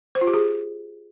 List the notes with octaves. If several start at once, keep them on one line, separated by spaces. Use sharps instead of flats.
C5
F4
G4
G#4